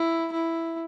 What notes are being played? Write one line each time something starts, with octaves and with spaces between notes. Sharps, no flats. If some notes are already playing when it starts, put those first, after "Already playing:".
Already playing: E4
E4